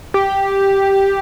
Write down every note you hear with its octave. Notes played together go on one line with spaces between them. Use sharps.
G4